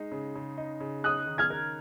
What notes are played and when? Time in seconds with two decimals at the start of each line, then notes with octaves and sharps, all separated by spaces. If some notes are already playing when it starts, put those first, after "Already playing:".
Already playing: G#3 D#4
0.12 C#3
0.36 C#3
0.57 D#4
0.80 C#3
1.04 D#4 D#6 F#6
1.27 D#3
1.38 F6 G#6
1.50 A#4